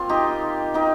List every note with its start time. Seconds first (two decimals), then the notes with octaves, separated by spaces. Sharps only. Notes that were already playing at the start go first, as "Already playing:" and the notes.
Already playing: A#3 C4 F4
0.09 D#4 G4
0.74 D#4 G4